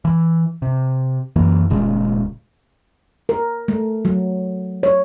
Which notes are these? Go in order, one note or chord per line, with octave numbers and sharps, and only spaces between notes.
E3
C3
F#2 E3 A#3
D#1 A#2 C#3 G#3
A#4
A3
F#3
C#5